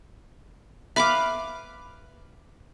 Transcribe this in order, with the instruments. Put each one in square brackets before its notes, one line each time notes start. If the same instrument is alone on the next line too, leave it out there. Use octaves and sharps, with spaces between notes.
[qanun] B4 F5 D6 [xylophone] E5 B5